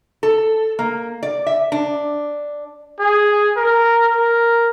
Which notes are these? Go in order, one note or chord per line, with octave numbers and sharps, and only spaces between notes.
A4
A#3
D5
E5
D4
G#4
A#4
A#4